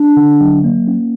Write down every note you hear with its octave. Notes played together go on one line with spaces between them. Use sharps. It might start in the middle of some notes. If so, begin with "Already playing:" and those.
Already playing: D4
D3
F#3
A#3
C#4